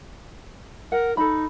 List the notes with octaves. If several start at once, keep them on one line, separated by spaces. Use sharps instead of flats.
A#4 F#5
D#4 A4 B5